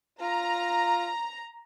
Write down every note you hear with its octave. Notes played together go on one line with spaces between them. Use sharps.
F4 A#5